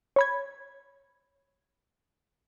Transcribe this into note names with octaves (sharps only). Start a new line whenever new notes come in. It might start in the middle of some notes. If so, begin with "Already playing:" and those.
C#5 B5 G#6